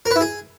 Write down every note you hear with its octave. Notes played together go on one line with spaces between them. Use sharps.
A#4
B4
E4
G#4